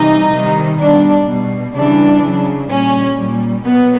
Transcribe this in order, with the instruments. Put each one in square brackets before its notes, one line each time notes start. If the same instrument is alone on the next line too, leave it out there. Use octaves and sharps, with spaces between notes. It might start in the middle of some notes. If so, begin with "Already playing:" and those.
Already playing: [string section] C3 E3 G3 D#4
C3 D#3 G3
B2 G3 D4
B2 G3
C#3 E3 G3 D4
C#3 F#3
A#2 G3 C#4
A#2 G3
B2 F#3 B3